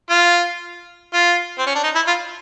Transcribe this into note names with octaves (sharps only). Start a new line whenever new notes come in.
F4
F4
C4
C#4
D4
D#4
E4
F4